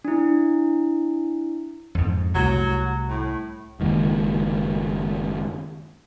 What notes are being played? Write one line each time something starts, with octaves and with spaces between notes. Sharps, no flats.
D4 E4
F2 G#2
C2 F#3 A3
A2
F#1 D#3 G#3 A#3